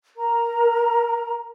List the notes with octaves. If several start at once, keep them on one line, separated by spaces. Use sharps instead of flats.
A#4 A#5